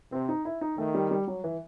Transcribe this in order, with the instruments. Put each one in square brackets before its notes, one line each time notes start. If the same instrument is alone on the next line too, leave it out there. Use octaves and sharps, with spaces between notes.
[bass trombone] C3 [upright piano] C4
[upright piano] D#4
E4
D#4
[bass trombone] D#3 [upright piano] A3
[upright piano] G3
G3
F#3
E3